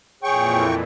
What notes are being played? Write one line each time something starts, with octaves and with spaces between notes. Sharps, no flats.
F2 A#2 E3 G#4 C#5 G5 C#6